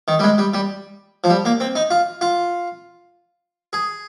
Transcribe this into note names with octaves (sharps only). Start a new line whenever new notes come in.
D#3
G3
G#3
G3
G3
F3
G3
A#3
C4
D#4
F4
F4
G#4